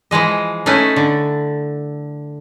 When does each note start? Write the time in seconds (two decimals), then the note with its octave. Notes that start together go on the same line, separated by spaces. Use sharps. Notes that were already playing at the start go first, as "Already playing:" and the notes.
0.11 E3 F3 G#3 D#5
0.66 A3 C#4 D#4 E4 B4
0.96 D3